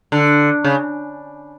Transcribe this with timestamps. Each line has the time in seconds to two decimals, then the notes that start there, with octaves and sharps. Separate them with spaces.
0.12 D3
0.64 C#3